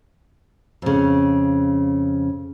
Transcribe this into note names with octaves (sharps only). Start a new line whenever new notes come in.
F2 C#3